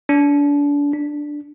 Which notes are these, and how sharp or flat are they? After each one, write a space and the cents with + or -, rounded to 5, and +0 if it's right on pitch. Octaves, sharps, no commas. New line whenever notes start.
D4 -30
D4 +5